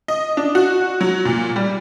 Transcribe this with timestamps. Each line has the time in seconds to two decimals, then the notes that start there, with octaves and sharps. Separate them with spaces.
0.08 D#5
0.37 D4
0.55 F#4
1.01 F#3
1.25 A#2
1.56 G3